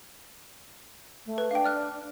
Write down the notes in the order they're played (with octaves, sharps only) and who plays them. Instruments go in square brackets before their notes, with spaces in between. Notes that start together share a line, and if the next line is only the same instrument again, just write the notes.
[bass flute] A3
[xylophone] B4
[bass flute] D4 [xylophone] F5 G5
[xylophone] D5 F6 F#6